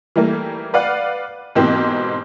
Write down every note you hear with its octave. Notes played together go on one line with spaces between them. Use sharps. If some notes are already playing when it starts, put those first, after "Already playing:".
E3 G3 A3 A#3
B4 D5 F5 F#5 F#6
G#2 B2 E3 A#3 C4 G4